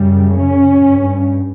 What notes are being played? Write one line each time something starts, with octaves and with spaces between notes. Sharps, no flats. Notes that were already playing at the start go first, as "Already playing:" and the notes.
Already playing: F#2 C#3 G3
C#4
G2